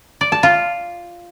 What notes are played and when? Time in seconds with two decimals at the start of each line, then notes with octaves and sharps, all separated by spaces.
0.21 D5
0.32 A5
0.43 F4